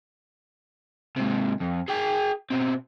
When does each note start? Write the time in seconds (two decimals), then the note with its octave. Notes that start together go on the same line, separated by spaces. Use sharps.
1.16 G#2 C3
1.60 F2
1.88 G#4 G5
2.50 B2 C4